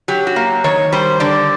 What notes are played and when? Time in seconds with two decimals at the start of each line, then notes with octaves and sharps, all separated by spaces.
0.08 F#3 G4
0.27 F#4
0.36 A#3
0.64 D#3 C#5
0.92 G3 C5
1.20 D3 D5